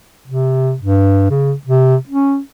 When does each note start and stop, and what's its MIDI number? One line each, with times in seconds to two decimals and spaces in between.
0.28 0.74 48
0.82 1.30 43
1.30 1.53 49
1.67 1.96 48
2.09 2.39 61